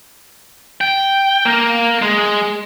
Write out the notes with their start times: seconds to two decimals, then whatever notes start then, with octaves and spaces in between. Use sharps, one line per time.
0.81 G5
1.45 A#3
2.02 G#3